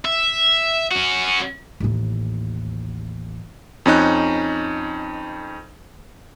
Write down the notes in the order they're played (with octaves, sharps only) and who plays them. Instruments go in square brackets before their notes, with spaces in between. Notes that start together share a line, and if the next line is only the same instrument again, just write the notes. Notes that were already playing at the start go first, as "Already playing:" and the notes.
[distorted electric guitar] E5
C#4 F#4
[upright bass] A1 D#2
[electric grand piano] F2 C#4 D#4 F#6